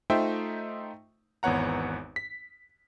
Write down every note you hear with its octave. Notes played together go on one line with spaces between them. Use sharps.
A3 D#4 F4 C5 E5 G5
G#1 E2 B3 C#5 F#5 A#5
B6